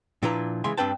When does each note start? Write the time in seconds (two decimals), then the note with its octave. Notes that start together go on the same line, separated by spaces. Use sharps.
0.23 A#2 F3 D4 E4 B4 A#5
0.64 C#3 E3 G#3 E5 G#5 C6
0.77 G2 C4 D4 B4 G5 A5